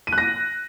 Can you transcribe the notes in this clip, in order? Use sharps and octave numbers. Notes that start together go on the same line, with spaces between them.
D#7
F#6
A#6